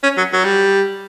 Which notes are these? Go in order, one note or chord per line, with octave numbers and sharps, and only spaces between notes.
C#4
F#3
F#3
G3